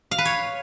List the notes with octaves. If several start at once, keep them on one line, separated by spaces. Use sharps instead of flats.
F5
B4
C#5